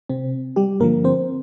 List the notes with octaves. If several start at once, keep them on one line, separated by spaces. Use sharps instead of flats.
C3 C4
G3 G4
G2 D3 F3 A#3 A#4
C4 C5